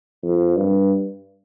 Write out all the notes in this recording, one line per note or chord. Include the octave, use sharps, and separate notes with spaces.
F2
G2